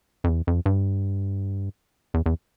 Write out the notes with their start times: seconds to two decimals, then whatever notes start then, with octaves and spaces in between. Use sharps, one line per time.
0.24 F2
0.29 E2
0.47 F2
0.66 G2
2.14 E2
2.26 E2